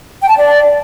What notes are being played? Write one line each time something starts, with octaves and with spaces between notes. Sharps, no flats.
G5
A5
D5